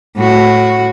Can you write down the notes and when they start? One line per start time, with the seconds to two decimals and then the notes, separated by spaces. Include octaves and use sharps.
0.17 A2 F#4